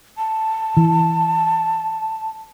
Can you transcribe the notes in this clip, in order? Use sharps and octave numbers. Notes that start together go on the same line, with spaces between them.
A5
E3